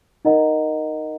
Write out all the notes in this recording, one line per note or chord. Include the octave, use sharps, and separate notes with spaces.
D#4 A#4 D#5 F#5 A#5